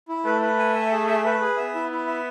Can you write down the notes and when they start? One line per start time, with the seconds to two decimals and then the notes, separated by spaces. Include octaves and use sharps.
0.09 E4
0.25 A3 B4
0.41 B4
0.58 G#5
0.74 E5
0.92 G#4
1.07 E5
1.25 B4
1.40 G#4
1.57 B3 E5
1.75 E4
1.91 E4
2.07 E5